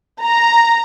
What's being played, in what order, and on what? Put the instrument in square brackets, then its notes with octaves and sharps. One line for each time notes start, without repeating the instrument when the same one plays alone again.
[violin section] A#5